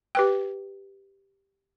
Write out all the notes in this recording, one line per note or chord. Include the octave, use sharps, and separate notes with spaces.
G4 B4 G5